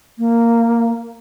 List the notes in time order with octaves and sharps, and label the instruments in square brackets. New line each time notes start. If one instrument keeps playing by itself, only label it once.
[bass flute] A#3